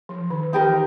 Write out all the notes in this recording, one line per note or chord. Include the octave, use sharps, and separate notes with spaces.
F3
D#3
E3 D#4 G4 A#4 D#5